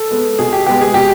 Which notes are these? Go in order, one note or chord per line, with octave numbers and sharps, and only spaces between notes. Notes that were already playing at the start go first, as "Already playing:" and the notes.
Already playing: A4
G#3 B3
B2 G#4
G4
G#3 B3 G4
G#4
B2 G4